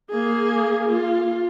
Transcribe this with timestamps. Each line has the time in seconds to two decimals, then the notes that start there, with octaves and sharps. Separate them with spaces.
0.10 A#3 G#4
0.88 F4